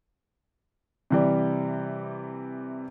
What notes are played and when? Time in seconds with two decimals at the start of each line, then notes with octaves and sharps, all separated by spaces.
1.10 C3 E3 G3